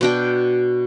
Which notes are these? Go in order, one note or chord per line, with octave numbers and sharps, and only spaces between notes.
B2 D4 G5